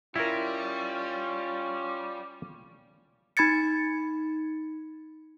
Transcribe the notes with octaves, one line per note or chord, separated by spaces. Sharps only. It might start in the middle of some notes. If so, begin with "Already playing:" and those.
G3 C#4 E4 F4 A#4
D#4 B5 G#6 A6 C#7